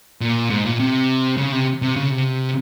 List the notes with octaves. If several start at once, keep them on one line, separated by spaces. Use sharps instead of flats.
A#2
G#2
A#2
C3
C#3
C3
C3
C#3
C3